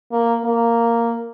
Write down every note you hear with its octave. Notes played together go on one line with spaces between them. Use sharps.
A#3
A#3